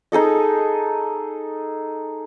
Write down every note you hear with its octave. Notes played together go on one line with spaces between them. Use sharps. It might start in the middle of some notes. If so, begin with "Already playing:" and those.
D#4 G#4 A4 D#5